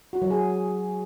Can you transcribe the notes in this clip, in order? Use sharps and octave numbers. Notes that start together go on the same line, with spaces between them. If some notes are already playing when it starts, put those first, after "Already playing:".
F#4
F#3
G#4